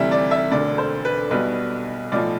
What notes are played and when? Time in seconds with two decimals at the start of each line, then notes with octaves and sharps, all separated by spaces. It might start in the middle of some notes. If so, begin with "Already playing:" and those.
Already playing: D2 C3 E3 G3 E5
0.11 D5
0.31 E5
0.51 E1 D2 D3 D5
0.78 C5
1.05 B4
1.31 B1 B2 G3 B4
2.12 B1 A2 F3 D5